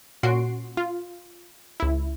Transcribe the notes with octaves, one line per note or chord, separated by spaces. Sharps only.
A#2 C#4 F#4 C6 C7 D7
F4
C#2 E4